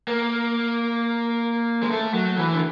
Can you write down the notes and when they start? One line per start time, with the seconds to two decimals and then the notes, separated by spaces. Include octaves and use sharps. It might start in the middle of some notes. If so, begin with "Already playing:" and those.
0.08 A#3
1.83 G#3
1.91 A3
2.14 F#3
2.37 E3
2.54 D3